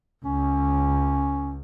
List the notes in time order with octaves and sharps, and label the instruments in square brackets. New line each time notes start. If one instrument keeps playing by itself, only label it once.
[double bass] C#2 [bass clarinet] C#4